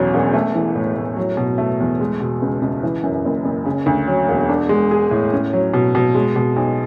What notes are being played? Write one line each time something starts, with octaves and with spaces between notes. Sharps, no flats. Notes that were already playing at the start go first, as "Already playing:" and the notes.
Already playing: A1 E2 B2 F#3
E1
A3
E3
A2
A2
F#3
B2
A3
E2
G#3
B2
C#2
C#2
E3
F#2
F#1
F#1
C#3
D2
F#3
E1
D4
G#3
G#4
A2
C#4
F#3
B2
B2
G#3
B2
B1